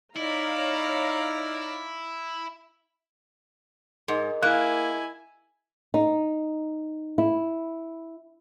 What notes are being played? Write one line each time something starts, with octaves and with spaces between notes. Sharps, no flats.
D#4 E4 C#5 D5 F5 A#5
G#2 G#4 A#4 D#5
A#3 E4 G#5 F#6
D#4
E4